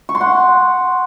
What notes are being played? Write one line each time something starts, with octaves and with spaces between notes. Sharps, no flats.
C#6
C6
F#5